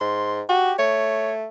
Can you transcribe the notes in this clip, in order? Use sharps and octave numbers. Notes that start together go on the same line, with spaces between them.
G#2 C6
F#4 G4
A3 C#5